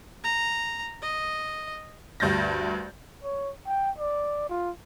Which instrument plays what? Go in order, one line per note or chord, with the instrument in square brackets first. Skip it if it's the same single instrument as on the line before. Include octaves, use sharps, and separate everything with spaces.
[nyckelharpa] A#5
D#5
[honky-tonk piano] D2 G2 G6 A6 A#6
[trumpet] C#5
G5
D5
F4